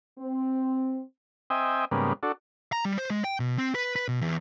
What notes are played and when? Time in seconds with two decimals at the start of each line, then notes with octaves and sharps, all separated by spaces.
0.19 C4
1.50 C4 D#5 E5 G5 G#5
1.91 G#2 C#3 G3 A#3 B3
2.23 D4 F#4 A4
2.72 A#5
2.85 G3
2.98 C5
3.10 G#3
3.24 G5
3.40 B2
3.58 C4
3.75 B4
3.96 B4
4.08 B2
4.21 E2